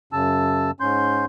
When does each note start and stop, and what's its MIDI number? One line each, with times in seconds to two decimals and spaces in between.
0.13 0.71 42
0.13 0.71 49
0.13 0.71 81
0.13 0.71 88
0.80 1.25 44
0.80 1.25 61
0.80 1.25 84
0.80 1.25 91